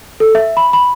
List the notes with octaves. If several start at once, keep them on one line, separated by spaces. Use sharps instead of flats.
A4
E5
B5
B5